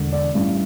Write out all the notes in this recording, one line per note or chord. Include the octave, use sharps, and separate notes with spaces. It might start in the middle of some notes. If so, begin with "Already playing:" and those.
Already playing: E1 D3
D5
A1 G2 E3